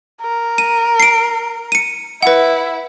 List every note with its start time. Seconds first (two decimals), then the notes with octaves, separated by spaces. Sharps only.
0.22 A#4
0.58 D#7
1.00 C7 D7
1.72 C#7 D#7
2.23 E4 B4 F#5